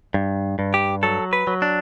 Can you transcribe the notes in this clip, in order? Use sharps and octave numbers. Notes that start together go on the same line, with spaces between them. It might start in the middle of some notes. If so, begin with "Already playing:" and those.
G2
G2
G4
F#3 A4
B4
F#3
D4